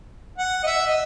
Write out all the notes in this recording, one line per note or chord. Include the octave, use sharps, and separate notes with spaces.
F#5
D#5
E5
D#5